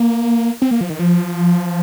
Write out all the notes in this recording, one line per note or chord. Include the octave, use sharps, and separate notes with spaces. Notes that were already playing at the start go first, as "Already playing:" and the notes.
Already playing: A#3
C4
A#3
F3
D#3
F3